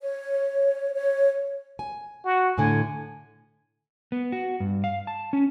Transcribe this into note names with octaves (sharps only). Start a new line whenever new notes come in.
C#5
C#5
G#5
F#4
A2 D3 G#5
B3
F#4
G2
F5
A5
C#4